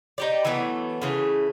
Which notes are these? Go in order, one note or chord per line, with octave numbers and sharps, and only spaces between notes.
D#4 G4 D5
E3 F#3 A3 B3
C#3 E3 A3